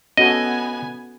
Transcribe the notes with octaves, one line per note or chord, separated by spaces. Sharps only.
B3 C#4 F#4 A4 D#5 G#5